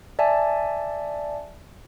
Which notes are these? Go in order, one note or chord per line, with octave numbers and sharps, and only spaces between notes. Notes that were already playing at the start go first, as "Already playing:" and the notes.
D5 E5 G#5 A5